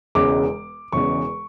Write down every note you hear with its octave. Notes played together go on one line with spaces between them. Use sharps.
E1 E2 C#3 G#3 D6
E1 E2 C#3 G#3 C#6